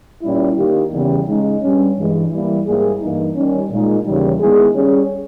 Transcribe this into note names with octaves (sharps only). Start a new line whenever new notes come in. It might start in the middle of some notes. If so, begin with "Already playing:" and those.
A#2 G3 C#4 E4
D#3 A#3 D#4 G4
E2 C#3 G3
C#3 G#3 D#4
G2 G3 C#4
G2 E3 G#3
E3 G3 A#3 E4
G#2 G3 A#3 E4 G#4
G2 E3 A#3 D#4
D#3 G3 C#4
A#2 G#3 D#4
D#2 C#3 E3 G3
D#3 G#3 B3 E4 G#4
G3 C#4 G#4 C#5